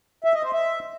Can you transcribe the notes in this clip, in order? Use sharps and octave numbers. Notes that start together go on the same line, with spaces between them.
E5
D#5
C5
E5